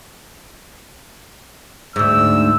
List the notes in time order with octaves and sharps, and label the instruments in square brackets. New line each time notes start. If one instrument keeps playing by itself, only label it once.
[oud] D2 G#2 [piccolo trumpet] E6